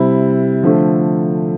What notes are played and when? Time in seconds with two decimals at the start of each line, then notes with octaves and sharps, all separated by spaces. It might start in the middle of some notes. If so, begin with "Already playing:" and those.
Already playing: C3 G3 C4 E4
0.63 D3 F3 A3